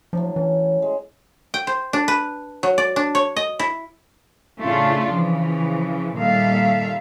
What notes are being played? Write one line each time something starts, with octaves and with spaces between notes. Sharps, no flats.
A2 F3 F#3 D4
E3 C#4
G#3
G5
C5
D4
B4
F#3
D5
D4
C#5
D#5
E4
A2 C#3 A3 D4 F4
C#3 E3 F3
A#2 D#3 G3 A4 E5 F5